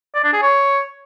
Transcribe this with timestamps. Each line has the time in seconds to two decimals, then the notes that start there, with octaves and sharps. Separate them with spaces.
0.15 D5
0.24 D4
0.33 G#4
0.42 C#5